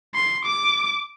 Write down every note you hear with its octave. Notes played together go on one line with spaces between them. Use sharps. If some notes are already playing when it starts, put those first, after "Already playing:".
C6
D6